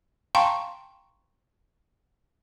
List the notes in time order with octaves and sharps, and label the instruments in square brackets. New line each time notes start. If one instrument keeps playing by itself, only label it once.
[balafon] F5 G5 A5 A#5 C6 C#6